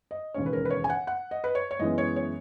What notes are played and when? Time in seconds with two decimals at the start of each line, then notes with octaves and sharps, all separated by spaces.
0.11 D#5
0.34 E1 D#2 C#3 G#3 C#4 C#5
0.46 B4
0.53 A#4
0.65 B4
0.70 C#5
0.84 G#5
0.90 F#5
1.07 F#5
1.31 D#5
1.44 B4
1.55 C#5
1.71 C#5
1.79 F#2 E3 G#3 B3 D#5
1.98 C#5
2.16 C#5